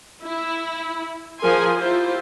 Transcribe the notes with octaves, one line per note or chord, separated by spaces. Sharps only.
E4
F3 G#4 A#4 G#5 C6
E4 F4 G4 C5